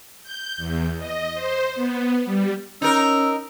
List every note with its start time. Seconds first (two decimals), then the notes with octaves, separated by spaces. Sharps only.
0.23 G6
0.57 E2
0.98 D#5
1.34 C5
1.75 B3
2.26 G3
2.82 C#4 D#4 A#4 E6